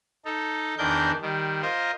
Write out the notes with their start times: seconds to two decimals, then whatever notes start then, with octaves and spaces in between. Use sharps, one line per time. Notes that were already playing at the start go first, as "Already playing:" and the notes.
0.25 D#4 A4
0.78 E2 D#3 D4 A#4 G6
1.21 D#3 G3
1.62 F4 A#4 C5 D#5